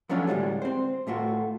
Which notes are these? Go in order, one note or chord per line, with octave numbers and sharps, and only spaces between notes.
F3 F#3 A3 C#4 D4 F4
D2 A2 G3 G#3
C4 C5
A2 A3 F4 F#4